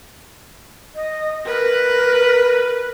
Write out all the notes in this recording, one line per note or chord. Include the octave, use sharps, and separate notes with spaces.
D#5
A#4 B4